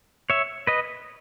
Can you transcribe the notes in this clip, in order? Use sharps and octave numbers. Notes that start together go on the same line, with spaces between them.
C#5 E5
B4 D#5